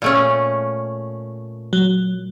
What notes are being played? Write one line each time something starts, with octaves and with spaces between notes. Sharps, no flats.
A#2 A3 C#4
F#3